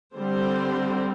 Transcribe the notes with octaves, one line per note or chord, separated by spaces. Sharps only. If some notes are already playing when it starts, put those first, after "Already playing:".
D3 G3 C4 C5